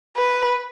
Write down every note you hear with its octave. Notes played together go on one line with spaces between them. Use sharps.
B4